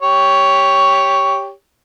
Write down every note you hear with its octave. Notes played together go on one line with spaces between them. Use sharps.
G4 C#5